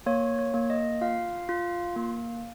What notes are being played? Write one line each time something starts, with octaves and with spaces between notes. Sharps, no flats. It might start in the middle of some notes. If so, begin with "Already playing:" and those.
A#3 C#5
C#5
A#3
D#5
F4 F5
F4
A#3